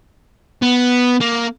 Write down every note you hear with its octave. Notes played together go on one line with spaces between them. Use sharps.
B3
A#3